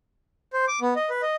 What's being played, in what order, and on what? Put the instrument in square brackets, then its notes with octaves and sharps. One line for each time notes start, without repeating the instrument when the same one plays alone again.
[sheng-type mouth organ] C5
D6
B3
D#5
B4
D#5